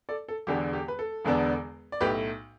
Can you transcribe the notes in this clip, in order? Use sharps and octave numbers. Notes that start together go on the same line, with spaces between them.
A4 D5
A4
E1 E2 D3 B3 D4 G4
G4
B4
A4
E1 E2 D3 B3 D4
D5
B1 A2 A3 G4 B4